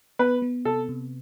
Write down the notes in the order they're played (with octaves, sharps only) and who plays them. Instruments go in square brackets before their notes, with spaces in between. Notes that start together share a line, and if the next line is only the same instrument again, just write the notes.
[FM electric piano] B3 [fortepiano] B4
[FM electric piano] B3
[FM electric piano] C3 [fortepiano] A4
[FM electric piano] C3